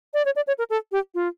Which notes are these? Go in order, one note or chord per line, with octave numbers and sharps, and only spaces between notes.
D5
C#5
D5
C#5
A#4
A4
G4
F4